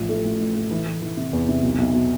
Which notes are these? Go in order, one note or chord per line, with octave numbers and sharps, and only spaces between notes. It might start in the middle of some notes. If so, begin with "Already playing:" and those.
Already playing: A1 F3
A3
A2
A2
A3
E3
E3
E3
C3
E2
C3
B1
B1
B2